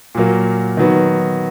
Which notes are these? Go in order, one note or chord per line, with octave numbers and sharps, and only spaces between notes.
A#2 F#3 A#3
D#3 F#3 B3